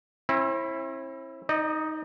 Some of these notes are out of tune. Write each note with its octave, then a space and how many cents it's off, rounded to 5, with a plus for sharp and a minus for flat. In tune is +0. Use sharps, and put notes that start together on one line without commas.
C4 +45 E4 +0
D#4 +10 D#5 -40